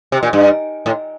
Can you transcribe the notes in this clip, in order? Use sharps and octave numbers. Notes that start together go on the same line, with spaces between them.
C3
A#2
G2
A2